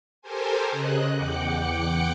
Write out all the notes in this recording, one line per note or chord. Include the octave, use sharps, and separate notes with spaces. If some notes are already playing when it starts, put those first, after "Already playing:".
G4 A4 A#4 C5 G#5
C#3 D#5 F#6
E2 F#5 G5 D6 F#6 C#7